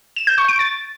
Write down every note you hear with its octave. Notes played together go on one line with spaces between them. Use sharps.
E7
G6
C#6
D7
A6